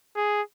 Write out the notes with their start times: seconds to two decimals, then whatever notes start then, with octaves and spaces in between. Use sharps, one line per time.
0.16 G#4